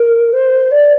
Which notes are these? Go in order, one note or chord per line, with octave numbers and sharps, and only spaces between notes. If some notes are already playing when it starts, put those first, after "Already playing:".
Already playing: A#4
C5
D5